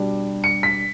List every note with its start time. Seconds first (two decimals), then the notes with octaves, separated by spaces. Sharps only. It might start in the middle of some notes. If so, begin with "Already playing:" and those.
Already playing: B2 G3 D4
0.44 C#7
0.63 B6